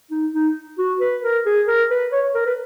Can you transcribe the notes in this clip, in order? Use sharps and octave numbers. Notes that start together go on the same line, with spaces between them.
D#4
D#4
F#4
B4
A#4
G#4
A#4
B4
C#5
A#4
B4